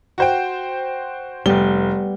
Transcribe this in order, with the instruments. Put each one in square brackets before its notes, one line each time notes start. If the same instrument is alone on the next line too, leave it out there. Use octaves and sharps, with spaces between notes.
[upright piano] F#4 C5 G5
[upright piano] F1 G7 [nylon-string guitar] G3 B3